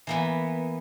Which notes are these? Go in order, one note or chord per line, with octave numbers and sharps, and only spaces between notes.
E3 A#3 B3